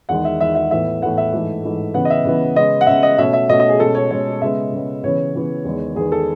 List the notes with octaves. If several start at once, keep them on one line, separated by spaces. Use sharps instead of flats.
E2 D#3 G#3 F#5
E5
E2 D#3 G#3 E5
E5
A2 E3 B3 E5
A2 E3 B3 F#5
E5
G#2 E3 A3
G#2 E3 A3
C#3 E3 B3 F#5
D#5
E5
C#3 E3 B3
C#3 G#3 B3 D#5
F#5
C#3 G#3 B3 E5
D#5
B2 A3 C#4 E5
E5
B2 A3 C#4 D#5
D#5
G#4
B2 G#3 C#4 A4
C#5
B2 G#3 C#4 C#5
C#3 G#3 B3 E5
C#3 G#3 B3
C#3 E3 B3 C#5
C#3 E3 B3
E2 D#3 G#3 B3
E2 D#3 G#3 B3 G#4
A4